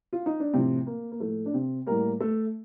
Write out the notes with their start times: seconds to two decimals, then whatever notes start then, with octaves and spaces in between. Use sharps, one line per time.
0.13 F4
0.26 D#4
0.40 D4
0.53 A2 C3 F3 C4
0.87 A#3
1.12 A#3
1.20 A2 F3 A3
1.46 D4
1.54 C3 C4
1.87 A2 G3 A#3 A#4
2.20 A3 A4